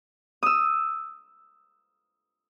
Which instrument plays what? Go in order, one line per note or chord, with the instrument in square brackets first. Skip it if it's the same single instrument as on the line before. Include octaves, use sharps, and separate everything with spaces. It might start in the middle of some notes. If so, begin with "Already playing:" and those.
[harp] D#6 E6